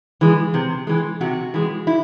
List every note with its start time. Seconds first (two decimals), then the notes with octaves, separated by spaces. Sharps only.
0.21 E3 G#3
0.54 C3
0.87 E3 G#3
1.21 C3 F#4
1.54 E3 G#3
1.87 E4